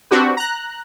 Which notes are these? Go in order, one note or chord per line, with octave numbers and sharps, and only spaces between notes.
C4 D4 F#4 G4 B4
A#5 F#6